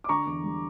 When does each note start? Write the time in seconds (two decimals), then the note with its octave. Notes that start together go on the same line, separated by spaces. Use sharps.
0.04 D6
0.09 D3 A#5 C#6
0.26 E2
0.44 G3